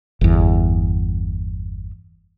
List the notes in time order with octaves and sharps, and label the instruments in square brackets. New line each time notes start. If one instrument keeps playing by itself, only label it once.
[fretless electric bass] G1 E2